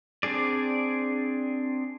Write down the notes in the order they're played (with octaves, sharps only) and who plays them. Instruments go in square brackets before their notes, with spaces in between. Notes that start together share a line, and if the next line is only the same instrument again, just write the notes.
[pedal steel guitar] C4 D4 G#4 D5